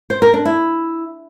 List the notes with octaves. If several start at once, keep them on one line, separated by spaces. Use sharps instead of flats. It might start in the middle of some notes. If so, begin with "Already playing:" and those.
C5
A#4
D4
E4